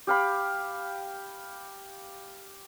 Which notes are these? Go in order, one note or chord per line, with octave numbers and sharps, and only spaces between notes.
G4 F5 B5